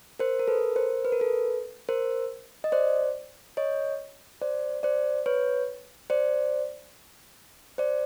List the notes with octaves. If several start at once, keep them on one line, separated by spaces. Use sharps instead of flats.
A#4 C5
A#4
A4 B4
A#4 C5
B4
A#4
A4 B4
A#4 C5
D#5
C5 D5
C#5 D#5
C5 D5
C5 D5
B4 C#5
C5 D5
C5 D5